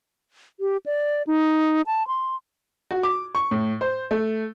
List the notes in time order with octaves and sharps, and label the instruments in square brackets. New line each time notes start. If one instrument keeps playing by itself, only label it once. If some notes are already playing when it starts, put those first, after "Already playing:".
[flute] G4
D5
D#4
A5
C6
[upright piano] F#4
D6
C#6
A2
C5
A3